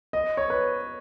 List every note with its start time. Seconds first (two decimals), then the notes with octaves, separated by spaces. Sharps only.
0.13 D#5
0.37 C#5
0.50 B4